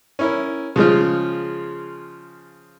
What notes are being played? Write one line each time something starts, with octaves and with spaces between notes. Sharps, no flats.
C#4 E4 A#4
C#3 F3 G#3 F4